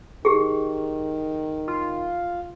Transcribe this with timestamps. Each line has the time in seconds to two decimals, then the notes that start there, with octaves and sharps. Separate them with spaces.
0.25 D#3 G4 G#4
1.68 F4